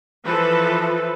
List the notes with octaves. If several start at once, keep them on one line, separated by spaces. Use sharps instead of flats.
E3 F3 A4 B4